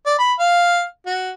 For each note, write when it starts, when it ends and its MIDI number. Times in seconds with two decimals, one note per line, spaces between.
0.06 0.14 74
0.19 0.33 83
0.39 0.83 77
1.06 1.31 66